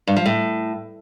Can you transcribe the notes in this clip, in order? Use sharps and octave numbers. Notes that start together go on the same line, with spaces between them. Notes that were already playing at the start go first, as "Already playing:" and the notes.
G2
F3
A2